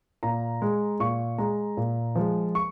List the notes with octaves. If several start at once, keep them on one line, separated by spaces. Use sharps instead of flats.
A#2 A#5
G#3
A#2 C#6
G#3 A#5
A#2
F3 G#3
C#6